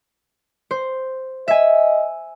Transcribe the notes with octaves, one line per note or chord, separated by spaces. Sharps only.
C5
D#5 E5 G#5